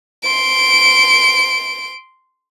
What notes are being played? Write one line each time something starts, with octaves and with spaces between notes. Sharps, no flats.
C6 D7